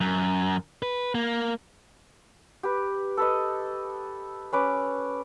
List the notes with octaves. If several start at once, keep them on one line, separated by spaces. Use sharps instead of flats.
F#2
B4
A#3
G4 B4
A4 B4 D#5
C#4 B4 D6